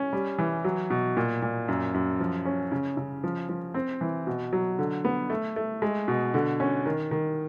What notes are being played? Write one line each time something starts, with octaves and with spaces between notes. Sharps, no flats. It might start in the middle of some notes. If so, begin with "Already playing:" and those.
Already playing: C#4
G3
E3
F#3
B2
A#2
A#2
F#2
F#2
F3
C#4
C#3
C#3
F3
F3
C4
E3
B2
F#3
D3
B3
A3
A3
G#3
B2
D3
C#4
D#3
D#3